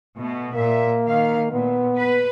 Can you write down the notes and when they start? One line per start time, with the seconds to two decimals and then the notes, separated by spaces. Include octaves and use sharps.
0.18 B2 A3
0.54 A#2 A#3 E5
1.07 D#3 F5
1.51 A#2 B3
1.97 B4